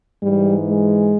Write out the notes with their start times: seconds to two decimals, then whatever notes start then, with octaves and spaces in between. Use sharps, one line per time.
0.22 G#2 E3 G3
0.68 G#3